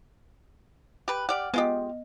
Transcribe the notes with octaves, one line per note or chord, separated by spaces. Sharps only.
G4 B4
G4 D5 F#5 F6
G#3 B3 F4 G4 D#5